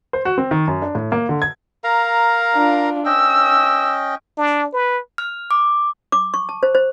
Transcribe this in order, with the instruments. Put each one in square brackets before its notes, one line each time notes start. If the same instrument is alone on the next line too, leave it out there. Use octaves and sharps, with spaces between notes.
[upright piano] C5
F#4
C4
D#3
F#2
D4
A2
A#3
D3
G#6
[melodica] A#4 F5 A#5
[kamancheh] D4 F4
[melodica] C#4 D#5 G5 [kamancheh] E6
[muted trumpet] D4
B4
[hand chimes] F6
D6
[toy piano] D6
C#6
A5
C5
C5